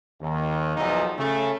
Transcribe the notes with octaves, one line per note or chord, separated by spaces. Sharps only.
D#2
B1 E2 F3 D#4
C#3 A3